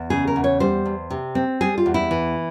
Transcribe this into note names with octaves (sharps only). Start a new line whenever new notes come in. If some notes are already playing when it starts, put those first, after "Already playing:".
Already playing: E2
C#3 G#4
A#4
E2
C#5
G3 C5
E2
C3
C4
G3 G#4
F4
E2
E4
E3